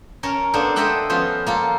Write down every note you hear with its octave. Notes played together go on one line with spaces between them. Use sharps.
C#4 A#4 C#5 A5
A#3 B3 D4 A4 C5
A4 C5 D#5 E5 F#5 G5
F3 B3 C#4 F4 C5
A#3 F4 A4